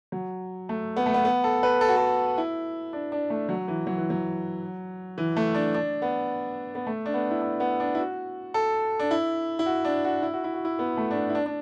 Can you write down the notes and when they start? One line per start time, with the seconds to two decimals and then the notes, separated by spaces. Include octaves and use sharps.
0.12 F#3
0.69 A3
0.96 B3
1.06 A3
1.14 B3
1.25 B3
1.44 A4
1.63 B4
1.81 A4
1.88 F#4
1.96 A4
2.38 E4
2.93 D4
3.12 D4
3.30 A3
3.49 F#3
3.68 E3
3.87 F#3
3.98 E3
4.10 F#3
5.18 E3
5.37 A3
5.54 D4
5.74 D4
6.02 B3
6.75 B3
6.87 A3
7.06 D4
7.14 B3
7.31 E4
7.41 D4
7.60 B3
7.80 D4
7.95 E4
7.99 F#4
8.54 A4
8.99 D4
9.11 E4
9.59 E4
9.66 F#4
9.85 D4
10.04 F#4
10.23 E4
10.33 F#4
10.44 E4
10.54 F#4
10.65 E4
10.79 B3
10.97 A3
11.11 D4
11.16 B3
11.30 E4
11.35 D4
11.46 D4